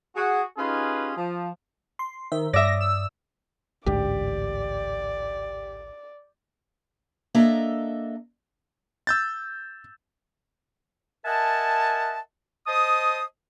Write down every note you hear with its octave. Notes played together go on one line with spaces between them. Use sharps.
F#4 G#4
C#4 D#4 F4 G4 G#4 B4
F3
C6
D#3 C5 E5
G2 D5 E5 D#6 A#6
E6
A1 D2 G#2 G4 D5
A#3 D4 A4 D#5 E5 A#5
E6 G6 A6
A#4 D#5 E5 F#5 G#5 A5
C5 D#5 A5 D#6